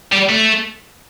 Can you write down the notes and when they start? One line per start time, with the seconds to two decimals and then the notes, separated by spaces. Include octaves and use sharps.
0.12 G3
0.29 A3